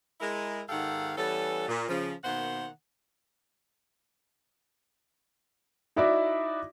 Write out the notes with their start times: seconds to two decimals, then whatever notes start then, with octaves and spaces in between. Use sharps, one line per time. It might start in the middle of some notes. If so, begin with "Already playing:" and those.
0.21 G#3 E4 A#4
0.69 G#2 D#3 G4 A4 F5 F#5
1.17 E3 G3 B3 C#4 A4
1.68 A#2
1.89 C#3 F3
2.24 B2 D#3 A#3 C5 F#5
5.96 D#4 E4 F#4 D5 E5 D6